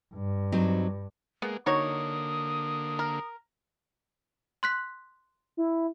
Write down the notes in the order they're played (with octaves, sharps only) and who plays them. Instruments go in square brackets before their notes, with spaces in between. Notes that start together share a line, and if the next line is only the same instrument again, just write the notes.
[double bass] G2
[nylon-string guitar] F#3 C4 D#4
[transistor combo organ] G#3 A#3 [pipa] B3
[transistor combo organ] D3 A#3 [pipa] D#4 F#4 C#5 [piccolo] D#6
[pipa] A#4
[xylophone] C6 F#6 B6
[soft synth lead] E4